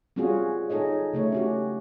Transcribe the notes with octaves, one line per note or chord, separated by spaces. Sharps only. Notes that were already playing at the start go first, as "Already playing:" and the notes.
G3 C4 C#4 F4 F#4 G#4
D#4 G#4 A4 C#5 D#5
C#3 A3 C#5
C#4 F#4 G4